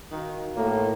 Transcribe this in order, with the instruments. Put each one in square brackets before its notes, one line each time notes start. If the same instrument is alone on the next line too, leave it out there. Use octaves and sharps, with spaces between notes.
[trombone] D#3 [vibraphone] D#4 F#4 F5
[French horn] A2 [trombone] A#3